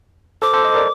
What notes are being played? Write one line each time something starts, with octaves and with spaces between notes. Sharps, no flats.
A4 C5 D6
A4 C5
C5 D#5
A#4 D5